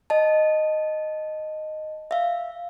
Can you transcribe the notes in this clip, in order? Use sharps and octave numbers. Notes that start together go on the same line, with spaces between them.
D#5 A5
E5 F5